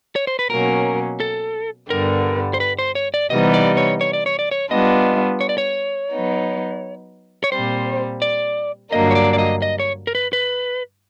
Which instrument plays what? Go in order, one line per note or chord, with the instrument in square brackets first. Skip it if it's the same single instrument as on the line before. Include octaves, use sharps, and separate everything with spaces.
[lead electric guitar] C#5
C5
B4
[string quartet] B2 F#3 A#3 C#4 [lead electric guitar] A#4
[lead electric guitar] A4
[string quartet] G2 D3 G3 B3 [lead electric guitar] A#4
[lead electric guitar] C5
B4
C5
C#5
D5
[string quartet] C3 E3 G3 B3 D#4 [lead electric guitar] D#5
[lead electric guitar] D5
C#5
C#5
D5
C#5
D5
C#5
[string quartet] G3 B3 D4 F4 [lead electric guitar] D#5
[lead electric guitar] C#5
D5
C#5
[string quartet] F#3 B3 D#4
[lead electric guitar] C#5
[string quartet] A#2 G3 C4 [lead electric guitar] C5
[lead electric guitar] D5
[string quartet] G2 D3 F#3 A#3 D4 [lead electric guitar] D#5
[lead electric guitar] C#5
D5
D5
D#5
D#5
C#5
A#4
B4
B4